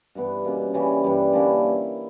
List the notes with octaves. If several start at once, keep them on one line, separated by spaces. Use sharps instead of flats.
G2 E3 B3
B2 A#3 C#4
C#3 E3 G3 C#4
G2 E3 G3
D3 A#3 C#4 E4